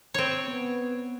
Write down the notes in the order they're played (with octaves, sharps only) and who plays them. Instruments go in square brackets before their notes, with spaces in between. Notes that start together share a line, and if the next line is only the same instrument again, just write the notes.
[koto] C4 C#5
[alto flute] B3